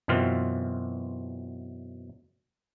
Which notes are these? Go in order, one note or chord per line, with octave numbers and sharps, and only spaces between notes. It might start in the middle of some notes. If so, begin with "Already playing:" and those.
F#2 B2 E3 C4 F4 F5